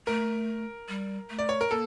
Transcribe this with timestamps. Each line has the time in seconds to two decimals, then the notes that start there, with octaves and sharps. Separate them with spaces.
0.07 A3 A#4
0.89 G3
1.30 A3
1.39 D5
1.49 C#5
1.61 A#4
1.71 A#3 A4